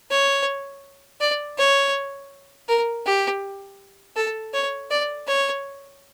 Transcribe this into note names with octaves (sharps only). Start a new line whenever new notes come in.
C#5
D5
C#5
A#4
G4
A4
C#5
D5
C#5